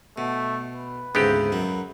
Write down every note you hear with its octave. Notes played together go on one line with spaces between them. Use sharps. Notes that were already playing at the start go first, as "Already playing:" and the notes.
B2 A3
B4
D2 G#2 C#3 B3 C4 G4
F#2 F#3